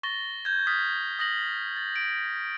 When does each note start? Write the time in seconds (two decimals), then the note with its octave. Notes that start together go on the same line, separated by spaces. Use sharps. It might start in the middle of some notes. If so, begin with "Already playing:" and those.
0.03 C#6 A6 A#6 G7
0.45 G6 G#6
0.67 D#6 F6 A6 B6
1.19 D#6 A#6 F#7
1.77 A6
1.96 D7